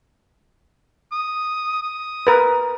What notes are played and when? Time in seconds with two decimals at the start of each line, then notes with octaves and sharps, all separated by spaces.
1.12 D#6
1.82 D#6
2.27 A#4 B4